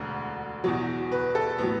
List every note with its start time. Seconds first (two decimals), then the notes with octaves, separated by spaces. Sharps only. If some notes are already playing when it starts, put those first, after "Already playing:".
Already playing: E1 D2 D3
0.64 E2 B2 F#3
1.12 B4
1.35 A4
1.58 A2 F#3 B3